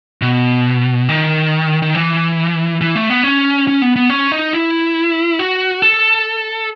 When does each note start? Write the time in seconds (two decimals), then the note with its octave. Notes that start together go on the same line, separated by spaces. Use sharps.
0.22 B2
1.09 D#3
1.82 D#3
1.95 E3
2.81 E3
2.95 A3
3.10 B3
3.23 C#4
3.67 C#4
3.82 B3
3.96 B3
4.10 C#4
4.32 D#4
4.53 E4
5.39 F#4
5.82 A4